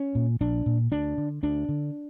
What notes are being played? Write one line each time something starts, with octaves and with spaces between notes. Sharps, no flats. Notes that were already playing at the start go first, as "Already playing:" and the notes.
Already playing: C#4
A#2
A#1 D4
A#2
D2 D4
D3
D2 D4
D3